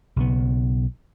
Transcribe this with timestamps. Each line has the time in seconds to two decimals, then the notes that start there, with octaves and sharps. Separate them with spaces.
0.16 B1 C#3 B3